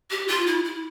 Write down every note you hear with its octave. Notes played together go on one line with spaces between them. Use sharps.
G4
F4
E4
E4